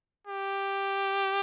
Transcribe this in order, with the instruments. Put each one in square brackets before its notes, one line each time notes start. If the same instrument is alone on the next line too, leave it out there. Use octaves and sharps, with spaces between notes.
[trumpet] G4